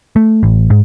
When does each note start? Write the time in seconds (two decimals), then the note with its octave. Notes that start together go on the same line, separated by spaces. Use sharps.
0.16 A3
0.43 A1
0.70 G#2